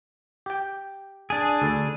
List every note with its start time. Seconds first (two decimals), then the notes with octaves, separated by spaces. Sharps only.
0.46 G4 G5
1.30 D4 G#4
1.62 D2 A4